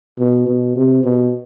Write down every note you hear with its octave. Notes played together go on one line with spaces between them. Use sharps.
B2
B2
C3
B2